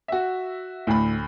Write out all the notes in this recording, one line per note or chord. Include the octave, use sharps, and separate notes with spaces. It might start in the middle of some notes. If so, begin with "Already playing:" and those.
F#4 E5
D2 A2 B5